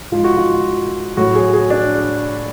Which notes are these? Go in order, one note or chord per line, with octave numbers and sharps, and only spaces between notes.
G#2 F3 F4
F#4
F4
A2 F#3 F#4
G#4
G#4
D4